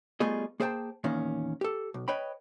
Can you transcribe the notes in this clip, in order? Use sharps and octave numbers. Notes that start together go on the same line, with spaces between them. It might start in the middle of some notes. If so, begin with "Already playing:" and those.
G3 A3 B3 F4 G#4 D#5
A#3 G#4 C5 C#5 G5 A5
E2 A#2 D#3 C#4
G4 A4
B1
B4 C#5 D#5 G5 B5